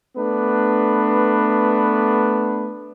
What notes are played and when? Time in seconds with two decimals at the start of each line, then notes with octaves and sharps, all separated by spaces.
0.16 A3 B3 D4 B4